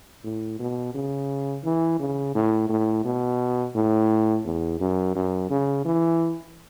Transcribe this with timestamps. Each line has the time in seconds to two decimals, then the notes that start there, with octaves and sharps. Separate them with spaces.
0.24 A2
0.59 B2
0.94 C#3
1.64 E3
1.99 C#3
2.35 A2
2.69 A2
3.05 B2
3.75 A2
4.45 E2
4.80 F#2
5.16 F#2
5.50 C#3
5.85 E3